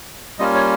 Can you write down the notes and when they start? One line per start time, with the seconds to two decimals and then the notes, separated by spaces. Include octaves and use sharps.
0.39 G3 A#3 C#4 F4 D#5
0.55 C#5